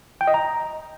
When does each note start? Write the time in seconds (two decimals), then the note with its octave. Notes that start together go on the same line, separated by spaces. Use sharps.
0.21 G5
0.27 D#5
0.34 A#5